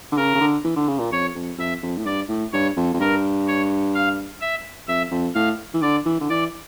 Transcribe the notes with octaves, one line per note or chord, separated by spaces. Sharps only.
D3
C#3 A#4
C#3
D3
E3
D3
C#3
A#2
F2 C#5
F2
F2 E5
F2
A2
G2 D5
A2
G2 C#5
F2
F2
G2 A#4
C#5
F5
E5
F2 E5
F2
A2 F5
E3
D3 D5
E3
D3
E3 D5